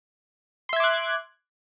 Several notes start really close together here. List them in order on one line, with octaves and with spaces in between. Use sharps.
C6 E5 G#6 D6 F#6